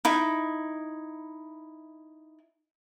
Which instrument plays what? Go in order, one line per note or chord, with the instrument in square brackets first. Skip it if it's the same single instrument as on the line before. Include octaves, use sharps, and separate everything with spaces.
[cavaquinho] D#4 E4